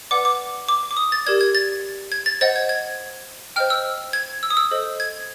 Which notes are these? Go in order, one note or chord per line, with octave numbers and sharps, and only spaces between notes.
B4 D5 F#5 D6
D6
D6
D6
D#6
A6
G4 A#4 D5 G#6
G#6
A6
G#6
A6
C5 D#5 F#5 A6
G#6
G#6
C5 D#5 G5 F6
E6
G#6
E6
D#6
E6
A4 C5 D#5
G#6